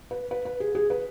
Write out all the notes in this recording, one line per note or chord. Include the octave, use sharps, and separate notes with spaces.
B4
B4
B4
G#4
G#4
B4